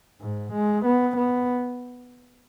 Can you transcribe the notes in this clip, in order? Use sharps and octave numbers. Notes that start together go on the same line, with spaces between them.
G#2
G#3
B3
B3